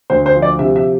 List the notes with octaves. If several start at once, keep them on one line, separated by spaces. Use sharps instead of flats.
D2 C5
C5
F3
D5
C3 E5
E5